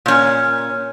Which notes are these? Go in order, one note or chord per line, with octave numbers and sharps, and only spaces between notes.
A#2 C#4